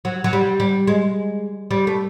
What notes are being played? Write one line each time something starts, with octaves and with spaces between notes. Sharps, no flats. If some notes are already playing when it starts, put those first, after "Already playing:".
F#3
F#3
G3
G3
G#3
G3
A3